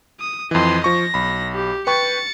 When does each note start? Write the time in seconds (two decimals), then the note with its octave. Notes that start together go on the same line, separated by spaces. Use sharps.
0.20 D#6
0.51 F2 E3 D#5 C6
0.84 F3 C#6 A#6
1.14 B1 B5
1.53 G4
1.87 B4 G5 C#6 A6 C#7